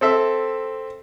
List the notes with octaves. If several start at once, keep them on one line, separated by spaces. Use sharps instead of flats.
C4 A4 E5